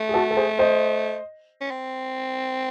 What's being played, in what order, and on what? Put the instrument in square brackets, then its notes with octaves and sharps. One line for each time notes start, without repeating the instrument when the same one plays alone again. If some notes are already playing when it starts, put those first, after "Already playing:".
Already playing: [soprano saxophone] A3
[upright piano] G#4
F#4 A4
A4
G#4 C5
C5 D#5
[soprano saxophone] C#4
C4